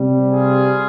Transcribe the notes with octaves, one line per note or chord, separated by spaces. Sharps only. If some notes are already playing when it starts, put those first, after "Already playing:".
Already playing: C3 G3
F4 G#4